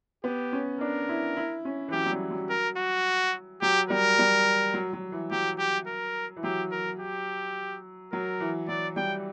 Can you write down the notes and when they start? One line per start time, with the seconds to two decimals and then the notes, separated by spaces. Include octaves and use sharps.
0.24 B3 G4
0.53 C#4
0.80 D4 A#4
1.09 E4
1.36 E4
1.65 C#4
1.88 E3
1.92 F#3 G4
2.06 F#3
2.12 G3
2.31 F#3
2.50 A#4
2.77 F#4
3.62 F#3 G4
3.90 G3 A#4
4.19 G3
4.74 F#3
4.93 F#3
5.12 E3
5.31 F#3 G4
5.59 G4
5.87 A#4
6.37 E3
6.44 F#3 G4
6.72 A#4
7.00 G4
8.12 F#3 A#4
8.40 E3
8.68 F#3 D5
8.96 G3 G5